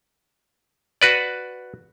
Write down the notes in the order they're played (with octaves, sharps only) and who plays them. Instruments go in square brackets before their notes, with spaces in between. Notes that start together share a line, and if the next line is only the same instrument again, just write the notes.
[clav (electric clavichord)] F#4 B4 D5